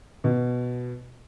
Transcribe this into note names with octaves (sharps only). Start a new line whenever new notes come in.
B2